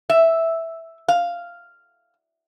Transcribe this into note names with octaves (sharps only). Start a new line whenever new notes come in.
E5
F5